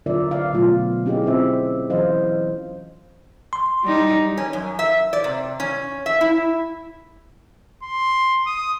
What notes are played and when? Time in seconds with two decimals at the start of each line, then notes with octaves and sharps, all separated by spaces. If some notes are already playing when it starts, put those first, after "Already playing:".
0.06 D3 F#3 F4 A#4 D5 E5
0.31 D5 F5
0.53 B2 F#3 A3 F4
1.06 C#4 E4 G4 G#4 D#5
1.24 C4 C#4 F4 C5 E5
1.89 E3 F#3 C5 D#5 F5
3.53 C6
3.84 G3 D#4
4.37 C#4
4.53 F#2
4.79 E5
5.13 D5
5.24 C3
5.60 C#4
6.06 E5
6.21 E4
7.83 C6
8.47 D#6